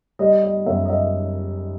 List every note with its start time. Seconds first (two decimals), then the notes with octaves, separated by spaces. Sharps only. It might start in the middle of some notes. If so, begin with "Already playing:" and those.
0.19 G3 D#5
0.43 D#5
0.66 F#2 E5
0.85 D#5
0.90 E5